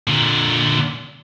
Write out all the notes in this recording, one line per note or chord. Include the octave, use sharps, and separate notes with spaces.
A#2 D3